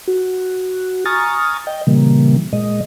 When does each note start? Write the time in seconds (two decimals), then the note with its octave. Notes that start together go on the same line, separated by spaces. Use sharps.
0.08 F#4
1.06 G#5 A#5 C#6 D#6 F6 A6
1.67 D#5 G5
1.87 A#2 C#3 E3 G3 A#3
2.53 A#2 G#3 D#5